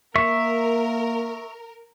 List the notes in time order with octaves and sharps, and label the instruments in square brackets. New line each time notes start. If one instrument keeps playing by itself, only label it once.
[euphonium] A#3 [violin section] A#4 [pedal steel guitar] E5 C#6